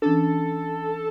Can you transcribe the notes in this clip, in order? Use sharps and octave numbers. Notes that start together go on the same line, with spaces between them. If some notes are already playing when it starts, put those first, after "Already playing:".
E3 C#4 D4 A4